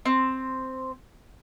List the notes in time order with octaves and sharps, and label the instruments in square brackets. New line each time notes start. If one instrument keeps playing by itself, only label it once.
[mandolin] C4